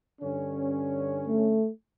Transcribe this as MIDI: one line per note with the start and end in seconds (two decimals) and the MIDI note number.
0.22 1.61 43
0.22 1.61 50
0.22 1.61 61
1.28 1.69 57